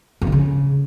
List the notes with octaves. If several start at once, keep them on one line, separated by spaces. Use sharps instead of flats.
F2
D#3
C#3